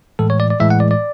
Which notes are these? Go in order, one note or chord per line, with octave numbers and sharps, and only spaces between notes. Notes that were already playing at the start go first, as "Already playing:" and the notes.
A2 E3 G#3 A4
C#5
D5
D5
A2 E3 G#3 E5
F#5
D5
D5